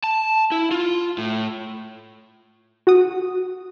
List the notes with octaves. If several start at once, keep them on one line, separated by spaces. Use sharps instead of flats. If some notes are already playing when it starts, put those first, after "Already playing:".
A5
E4
F4
A2
F#4 F#5 D#6